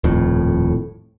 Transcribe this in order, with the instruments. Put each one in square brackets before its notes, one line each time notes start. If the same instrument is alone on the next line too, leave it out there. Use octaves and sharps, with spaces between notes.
[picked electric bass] D#1 F2 A2